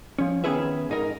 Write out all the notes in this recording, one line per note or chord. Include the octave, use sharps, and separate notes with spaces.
F3 C#4
D#3 B3 C#4 G#4 B4 E5
G#2 D#4 A#4